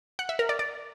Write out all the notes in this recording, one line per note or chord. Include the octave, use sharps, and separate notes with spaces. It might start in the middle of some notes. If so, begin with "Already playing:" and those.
F#5
E5
A#4
D5
D5